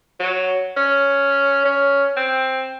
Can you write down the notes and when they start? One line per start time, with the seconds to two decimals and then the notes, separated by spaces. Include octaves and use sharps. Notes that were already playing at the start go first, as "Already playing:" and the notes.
0.19 F#3
0.77 C#4
1.65 C#4
2.17 C4